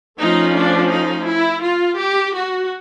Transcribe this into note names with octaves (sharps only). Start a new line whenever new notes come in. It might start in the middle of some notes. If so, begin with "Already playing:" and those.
F3 A3 C#4 D#4
D4
D#4
E4
F4
G4
F#4